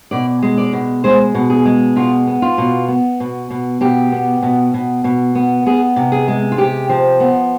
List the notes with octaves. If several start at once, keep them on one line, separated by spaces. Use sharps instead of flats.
B2 D5
G#3
D5
B2
G#3 C5
B2
G#4
G#3
B2 F4
B3
F4
B2
B3
B2
B2
B2 G4
B3
B2
B2
B2
B3
B3 G#4
C3
G#4
G#3
F4
C3 G4
F3
B3